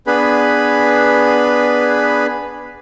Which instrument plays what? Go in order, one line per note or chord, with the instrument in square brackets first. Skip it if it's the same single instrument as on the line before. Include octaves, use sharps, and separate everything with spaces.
[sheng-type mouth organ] B3 D4 G#4 B4 B5